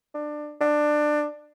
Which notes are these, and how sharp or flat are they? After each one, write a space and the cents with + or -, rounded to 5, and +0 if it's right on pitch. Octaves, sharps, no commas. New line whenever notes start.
D4 +20
D4 +20